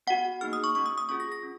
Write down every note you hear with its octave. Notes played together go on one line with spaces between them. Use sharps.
B3 F#4 F#5
A#3 D#4 G#4 F6
D#6
C#6
A#3 C#4 F#4 C#6
D#6
D#6
C#4 F4 G#4 C#6
A#6
A#6
C#4